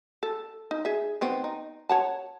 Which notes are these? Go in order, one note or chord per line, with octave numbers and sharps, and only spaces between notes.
A4
D#4
G#4 E5
D#3 B3 C4
D#4
C#5 F#5 A5